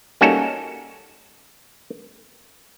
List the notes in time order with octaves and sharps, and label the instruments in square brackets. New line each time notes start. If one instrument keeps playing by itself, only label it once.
[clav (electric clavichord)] G3 A#3 C#4 D#4 F#4 A4